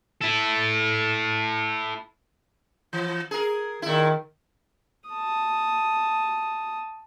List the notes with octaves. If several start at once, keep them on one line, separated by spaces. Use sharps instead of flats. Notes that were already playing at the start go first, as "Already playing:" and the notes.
E4 A4
E3
G#4 A#4
A#2 D#3 E4
A5 D#6